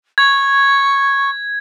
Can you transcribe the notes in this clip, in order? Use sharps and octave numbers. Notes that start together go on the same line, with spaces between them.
C#6 G#6